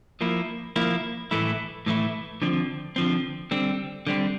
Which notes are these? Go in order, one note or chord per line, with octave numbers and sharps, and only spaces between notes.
F3 A#3 E4
F3 A#3 E4
A2 E3 A3 E4
A2 E3 A3 E4
D3 F3 C4
D3 F3 C4
D3 G3 C4
D3 G3 C4